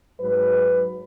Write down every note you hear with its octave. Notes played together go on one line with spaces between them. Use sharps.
G#2 F#3 B4